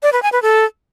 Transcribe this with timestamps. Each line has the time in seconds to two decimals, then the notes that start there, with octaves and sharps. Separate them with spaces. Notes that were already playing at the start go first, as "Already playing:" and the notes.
0.03 D5
0.13 B4
0.23 G#5
0.32 B4
0.42 A4